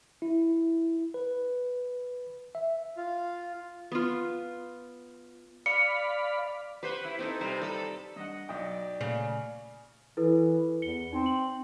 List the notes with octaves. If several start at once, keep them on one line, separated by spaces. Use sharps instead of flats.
E4
B4
E5
F4
B3 F4
D5 F5 B5 C#7
G4 B4 C5 F#5 C#6
E4
C4 D#4 A4
C3 G3 B4 C5 A#5
G3 A4
G2 D#5 F#5
B1 D5 D#5 G5
A#2 C#3 A3 F7
E3 E4 A4 B4
E2 C#7 G7
C4 D#4
F#7